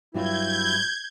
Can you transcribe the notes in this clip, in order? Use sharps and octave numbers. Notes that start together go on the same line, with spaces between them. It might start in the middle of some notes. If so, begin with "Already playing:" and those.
G2 F#3 E4 F4 G6 G#6